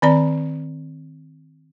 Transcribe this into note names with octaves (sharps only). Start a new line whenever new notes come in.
D#3 C4 D5 A#5